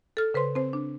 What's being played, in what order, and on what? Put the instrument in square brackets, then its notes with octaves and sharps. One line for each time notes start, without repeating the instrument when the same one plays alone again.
[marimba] A4 F6
C#3 B4 C5 C6
C4 C5
D4